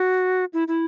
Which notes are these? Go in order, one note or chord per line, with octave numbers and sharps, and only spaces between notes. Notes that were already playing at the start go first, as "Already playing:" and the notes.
Already playing: F#4
E4
E4